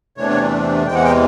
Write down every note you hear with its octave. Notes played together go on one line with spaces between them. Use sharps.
E2 C3 E3 A3 D4 C#5
C#5
E2 C3 E3 G#3 G5
F#5
G5